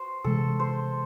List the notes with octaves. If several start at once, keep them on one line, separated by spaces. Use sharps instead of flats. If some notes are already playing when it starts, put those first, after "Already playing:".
Already playing: F#4 C5
C3 E3 G#3 A4
C5